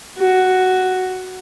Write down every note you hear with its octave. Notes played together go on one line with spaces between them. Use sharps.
F#4